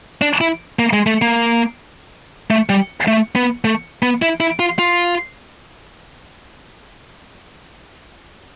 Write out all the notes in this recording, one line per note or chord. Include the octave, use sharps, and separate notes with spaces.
D4
E4
A#3
G#3
A3
A#3
A3
G3
A3
B3
A3
B3
E4
E4
F4
F4